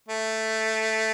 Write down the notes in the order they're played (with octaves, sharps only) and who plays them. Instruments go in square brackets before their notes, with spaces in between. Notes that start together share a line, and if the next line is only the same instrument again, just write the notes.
[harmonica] A3